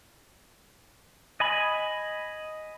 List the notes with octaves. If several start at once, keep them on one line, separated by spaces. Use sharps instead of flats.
D#5 G#5 B5